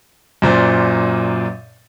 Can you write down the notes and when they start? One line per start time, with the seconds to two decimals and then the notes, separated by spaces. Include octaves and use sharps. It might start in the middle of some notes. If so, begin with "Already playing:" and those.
0.42 F#2 A#2 C5 D5